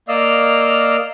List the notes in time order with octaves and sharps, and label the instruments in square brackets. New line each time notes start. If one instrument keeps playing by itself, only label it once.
[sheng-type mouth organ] A#3 D5 D#5 F5 E6 F6